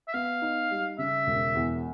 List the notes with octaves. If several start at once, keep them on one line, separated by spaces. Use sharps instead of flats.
E5
B3 F5
D#4
G3
C#3 E5
E1
E2